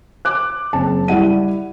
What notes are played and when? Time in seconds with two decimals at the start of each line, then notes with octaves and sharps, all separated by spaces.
0.25 D6 F#6
0.73 F#1 C4 A5
1.08 G3 E4 F#5 D#7